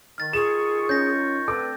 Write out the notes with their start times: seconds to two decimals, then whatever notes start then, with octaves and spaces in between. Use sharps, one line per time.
0.18 D#3 F6 A6
0.33 D#3 F4 G#4 C#6 E7
0.89 C#4 G6 A#6
1.48 D3 A3 C4 A4 B4 D6